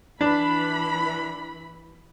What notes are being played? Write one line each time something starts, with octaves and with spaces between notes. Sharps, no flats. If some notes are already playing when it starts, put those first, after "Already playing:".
E3 D4 B5